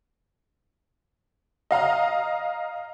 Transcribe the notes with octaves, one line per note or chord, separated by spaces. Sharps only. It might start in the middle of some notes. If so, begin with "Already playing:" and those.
D#5 F5 A#5 F6